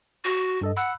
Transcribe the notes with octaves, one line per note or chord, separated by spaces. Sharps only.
F#4
G2 A4 D#5
F#5 B5 E6 F#6